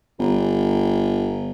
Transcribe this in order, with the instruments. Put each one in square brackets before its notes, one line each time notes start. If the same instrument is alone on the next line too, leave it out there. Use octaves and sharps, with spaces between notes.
[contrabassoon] G1